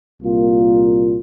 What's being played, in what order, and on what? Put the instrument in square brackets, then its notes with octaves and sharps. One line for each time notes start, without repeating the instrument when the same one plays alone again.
[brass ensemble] C2 A#2 A#3 F4